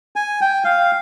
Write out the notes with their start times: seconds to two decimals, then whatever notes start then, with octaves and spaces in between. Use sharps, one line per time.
0.16 G#5
0.41 G5
0.64 F5